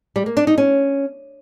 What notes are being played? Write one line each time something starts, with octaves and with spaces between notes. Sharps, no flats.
G3
A#3
D4
D#4
C#4